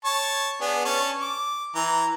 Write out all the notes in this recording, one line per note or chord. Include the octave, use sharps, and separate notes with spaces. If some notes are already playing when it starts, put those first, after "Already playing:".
C#5 A5 C#6
B3 D4 G#4
C#4 A5 C#6
D6
E3 A#5